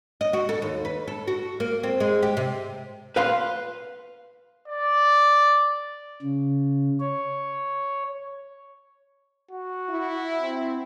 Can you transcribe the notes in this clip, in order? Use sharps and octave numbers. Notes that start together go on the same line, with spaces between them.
D#5
F#4
A4
D#2
B4
A4
F#4
A#3
C4
G#3
G4
C3
B4 F5 C6
D5
C#3
C#5
F#4
E4
C4